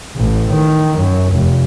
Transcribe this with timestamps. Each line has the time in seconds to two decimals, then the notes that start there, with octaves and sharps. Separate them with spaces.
0.16 A1
0.50 D#3
0.97 F#2
1.32 F1